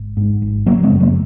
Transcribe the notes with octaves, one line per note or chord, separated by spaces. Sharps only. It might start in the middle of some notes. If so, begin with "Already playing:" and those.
Already playing: G#1
G#2
G#1
C#3 F#3 A#3
G#3 C4
F#2
F#3 A#3